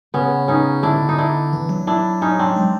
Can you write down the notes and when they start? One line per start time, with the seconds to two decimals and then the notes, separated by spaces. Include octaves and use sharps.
0.14 C#3 B3 C#4
0.48 C#4 D#4
0.83 D3 D4 E4
1.09 D#4
1.18 D4 E4
1.53 E3
1.69 F#3
1.87 D4 E4
2.22 C#4 D#4
2.39 C4 D4
2.56 G#3